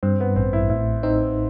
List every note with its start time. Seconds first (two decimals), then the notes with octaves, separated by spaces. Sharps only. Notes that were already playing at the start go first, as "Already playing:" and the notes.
0.03 G2 C4
0.20 B3
0.36 A1 C4
0.53 E4
0.70 A2 E4
1.03 C4 D#4